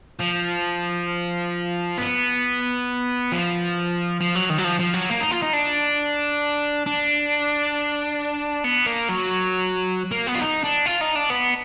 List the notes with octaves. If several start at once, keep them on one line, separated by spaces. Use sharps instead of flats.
F3
B3
F3
F3
F#3
D#3
F#3
F3
F3
F#3
A#3
D#4
F4
D#4
D4
D4
B3
A#3
F#3
A#3
B3
F4
D#4
D4
F4
D#4
D4
B3